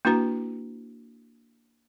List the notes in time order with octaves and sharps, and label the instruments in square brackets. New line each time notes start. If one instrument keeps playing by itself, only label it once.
[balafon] A#3 D4 E4 F#4 B4 A#5